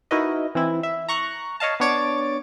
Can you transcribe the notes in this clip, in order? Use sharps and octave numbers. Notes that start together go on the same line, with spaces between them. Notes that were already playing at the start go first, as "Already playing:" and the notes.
D#4 E4 F#4 A#4 B4 D#5
E3 C4 E4
E5
A#5 C#6 F#6
C#5 D#5 F5 A5
B3 D4 C#5 D6 A6 D7